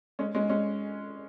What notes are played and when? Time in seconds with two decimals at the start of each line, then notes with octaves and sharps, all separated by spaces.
0.19 G#3 C#4
0.35 G#3 C#4
0.49 G#3 C#4